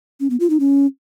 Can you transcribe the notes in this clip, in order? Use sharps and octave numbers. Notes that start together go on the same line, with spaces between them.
C#4
B3
F4
D#4
C#4